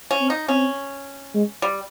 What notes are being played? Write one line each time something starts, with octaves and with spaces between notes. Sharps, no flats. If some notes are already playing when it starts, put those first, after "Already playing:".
C#4
C4
D#4
C4 C#4
G#3
G3